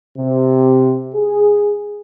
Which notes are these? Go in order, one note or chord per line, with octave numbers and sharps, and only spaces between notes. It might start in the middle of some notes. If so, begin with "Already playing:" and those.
C3
G#4